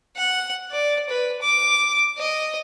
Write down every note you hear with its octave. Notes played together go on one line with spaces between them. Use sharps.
F#5
D5
B4
D6
D#5